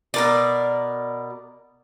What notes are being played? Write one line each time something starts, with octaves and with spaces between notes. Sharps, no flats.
B2 A#4 D5